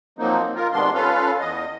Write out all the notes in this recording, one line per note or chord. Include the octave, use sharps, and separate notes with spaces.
F3 F#3 A#3 C4 D#4
F4 A#4
C3 D#3 G#3 B3 D4 C6
C#4 F4 A4 B4 F5
E2 D#5